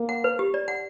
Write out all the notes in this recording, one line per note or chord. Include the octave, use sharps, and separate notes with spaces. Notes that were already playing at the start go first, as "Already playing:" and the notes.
Already playing: A#3
F#5
B4
G4
D5
F#5